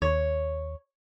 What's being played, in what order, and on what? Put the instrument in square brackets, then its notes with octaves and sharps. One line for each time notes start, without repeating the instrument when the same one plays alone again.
[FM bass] D#2 [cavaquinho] C#5